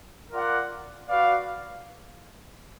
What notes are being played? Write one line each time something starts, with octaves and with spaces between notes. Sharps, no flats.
F4 A#4 D5 F#5
F#4 B4 D5 F5